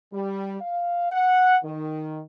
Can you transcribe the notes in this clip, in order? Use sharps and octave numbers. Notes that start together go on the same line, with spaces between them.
G3
F5
F#5
D#3